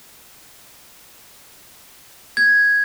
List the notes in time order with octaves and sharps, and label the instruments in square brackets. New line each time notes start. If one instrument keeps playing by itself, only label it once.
[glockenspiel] G#6